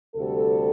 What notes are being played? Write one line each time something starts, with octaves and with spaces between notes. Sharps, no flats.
D2 C3 G3 A4